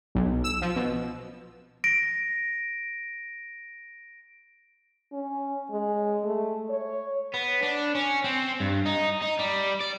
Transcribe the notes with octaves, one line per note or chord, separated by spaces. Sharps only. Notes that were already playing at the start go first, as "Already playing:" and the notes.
B1
E6
F3
B2
A#6 D7
C#4
G#3
A3
C#5
B3
D4
C#4
C4
G2
D#4
D#4
G3
D5